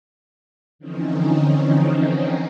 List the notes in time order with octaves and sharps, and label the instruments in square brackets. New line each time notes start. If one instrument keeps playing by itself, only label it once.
[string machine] D3 E3 F3 C4 C#4 D#4